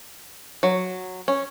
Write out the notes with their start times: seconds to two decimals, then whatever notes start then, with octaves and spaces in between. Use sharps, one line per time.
0.63 F#3
1.28 C#4